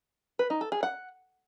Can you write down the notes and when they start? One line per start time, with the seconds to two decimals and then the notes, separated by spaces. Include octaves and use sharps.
0.39 B4
0.50 D#4
0.61 A4
0.72 G#4
0.83 F#5